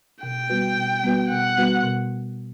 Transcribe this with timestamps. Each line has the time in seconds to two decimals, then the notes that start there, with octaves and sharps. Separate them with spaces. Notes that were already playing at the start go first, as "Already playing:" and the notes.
0.23 B2 G5
0.49 G3 B3 F#4 B4
0.76 B2
1.04 G3 B3 F#4 B4
1.30 B2 F#5
1.57 G3 B3 F#4 B4
1.83 B2